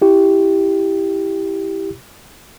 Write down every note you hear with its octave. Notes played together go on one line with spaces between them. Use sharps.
E4 G4